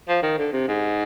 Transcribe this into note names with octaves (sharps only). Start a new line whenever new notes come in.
F3
D#3
D3
C3
G#2